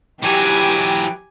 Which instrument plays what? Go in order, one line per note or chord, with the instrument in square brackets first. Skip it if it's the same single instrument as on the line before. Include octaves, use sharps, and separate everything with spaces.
[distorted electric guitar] E3 F#3 [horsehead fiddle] G4 [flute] G5 [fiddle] G#5 D6